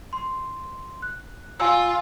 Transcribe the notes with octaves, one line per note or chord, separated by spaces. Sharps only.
C6
F#6
F4 G#5 E6